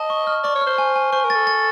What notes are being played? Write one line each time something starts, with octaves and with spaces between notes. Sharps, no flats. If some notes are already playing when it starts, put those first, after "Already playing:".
Already playing: D#5 A5
C#6
F6
D5 C#6
C#5
F6
C5
G#5
G#5
C5 C#6
A#4
A6
A4
A6